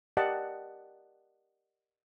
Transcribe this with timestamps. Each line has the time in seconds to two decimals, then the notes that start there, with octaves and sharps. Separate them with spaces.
0.17 G4 A#4 D5 D#5 F#5 A5